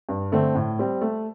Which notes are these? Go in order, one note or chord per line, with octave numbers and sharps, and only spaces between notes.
G2
D3 A3 C4
A2
G3 C4
A3